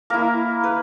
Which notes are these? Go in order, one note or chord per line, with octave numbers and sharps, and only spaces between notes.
A#3 E4 A#4
B4